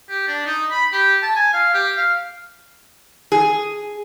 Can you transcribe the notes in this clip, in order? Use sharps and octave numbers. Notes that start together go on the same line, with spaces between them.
G4
D4
D#4
B5
G4
A5
G#5
F5
G4
F5
G#4